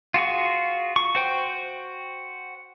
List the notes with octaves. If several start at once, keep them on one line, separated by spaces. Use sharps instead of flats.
F4 F#4 G#4 C#6
C#6
F#4 C5 G5